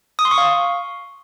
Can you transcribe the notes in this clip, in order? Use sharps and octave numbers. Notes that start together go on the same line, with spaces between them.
D#6
C6
C#6
F5